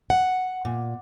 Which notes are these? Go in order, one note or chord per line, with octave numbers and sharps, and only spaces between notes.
F#5
A#2